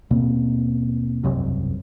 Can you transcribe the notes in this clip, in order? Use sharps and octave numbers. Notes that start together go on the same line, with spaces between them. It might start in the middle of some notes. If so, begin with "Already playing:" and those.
D#2 B2 A#3 C4
E1 C2 F#2 C3